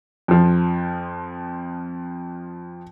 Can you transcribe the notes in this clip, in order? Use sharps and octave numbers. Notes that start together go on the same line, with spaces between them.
F2 F3